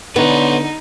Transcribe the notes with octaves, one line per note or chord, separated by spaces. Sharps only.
D3 B3 D#4 B4 C#5